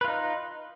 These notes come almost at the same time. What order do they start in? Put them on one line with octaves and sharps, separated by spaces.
B4 F4 D#4